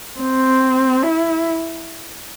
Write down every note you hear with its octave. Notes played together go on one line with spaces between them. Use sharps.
C4
E4